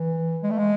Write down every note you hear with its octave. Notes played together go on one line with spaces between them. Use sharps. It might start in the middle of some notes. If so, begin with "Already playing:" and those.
Already playing: E3
G#3
A3
G#3